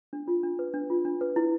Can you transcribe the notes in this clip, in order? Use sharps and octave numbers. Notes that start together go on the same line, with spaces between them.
D4
F4
D4
B4
D4
F4
D4
B4
E4